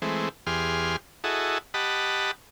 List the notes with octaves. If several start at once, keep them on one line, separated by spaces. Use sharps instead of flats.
E3 G#3 A3 C4
E2 G4 G#4 C6 F6
E4 F#4 G#4 A4 D#5
G4 D#5 F#5 A5 B5